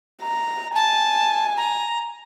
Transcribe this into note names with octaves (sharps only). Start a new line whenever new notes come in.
A#5
G#5 A5
A#5